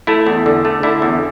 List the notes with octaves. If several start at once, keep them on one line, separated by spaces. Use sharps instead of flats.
A3 E4
E2
D3
A3
D3 E4
E2